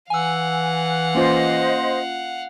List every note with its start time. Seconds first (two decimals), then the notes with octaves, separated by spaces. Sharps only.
0.10 E3 F5 F#5 G#5 E6
1.15 A#3 C#4 F4 C5 D#5 C6